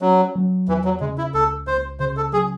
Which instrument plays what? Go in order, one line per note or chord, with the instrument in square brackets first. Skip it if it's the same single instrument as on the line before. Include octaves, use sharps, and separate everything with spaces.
[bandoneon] F#3 [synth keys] C#4
[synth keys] F#3
[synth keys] E2 [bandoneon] E3
[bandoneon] F#3
[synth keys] C#3 [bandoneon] G#3
[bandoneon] E4
[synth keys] C#2 [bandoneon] A4
[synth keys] C#2 [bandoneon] C5
[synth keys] C#3 [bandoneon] C5
[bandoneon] A4
[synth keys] F#3 [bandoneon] G#4